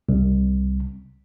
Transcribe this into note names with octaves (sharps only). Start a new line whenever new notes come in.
C2